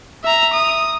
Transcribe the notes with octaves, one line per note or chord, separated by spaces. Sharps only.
E5 A#5
D#6